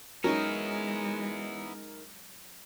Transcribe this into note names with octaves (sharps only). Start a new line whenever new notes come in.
F#3 G#3 B3 C#4 D#4 E4 A#4 C#5